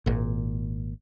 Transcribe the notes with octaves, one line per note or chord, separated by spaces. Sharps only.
G#1 A#2